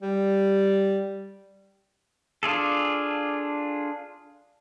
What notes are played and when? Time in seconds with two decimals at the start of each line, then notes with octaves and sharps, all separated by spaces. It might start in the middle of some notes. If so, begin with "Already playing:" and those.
0.02 G3
2.43 D4 F4 G#4 A4